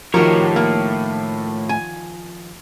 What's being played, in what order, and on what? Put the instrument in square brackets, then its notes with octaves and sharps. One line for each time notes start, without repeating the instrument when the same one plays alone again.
[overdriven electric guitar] A2 C#5 [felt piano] D#3 F3 [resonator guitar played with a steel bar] F#4 G4 A#4
[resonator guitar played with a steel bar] A#3
G#5